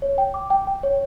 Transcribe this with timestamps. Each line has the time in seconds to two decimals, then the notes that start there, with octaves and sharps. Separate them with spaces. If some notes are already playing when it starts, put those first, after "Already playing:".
0.02 C#5
0.18 G5
0.34 D6
0.50 G5
0.67 G5
0.83 C#5